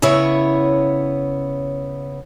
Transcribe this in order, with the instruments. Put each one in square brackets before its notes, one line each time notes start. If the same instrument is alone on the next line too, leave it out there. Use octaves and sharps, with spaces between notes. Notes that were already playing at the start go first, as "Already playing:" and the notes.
[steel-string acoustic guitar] C#3 B3 E4 C#5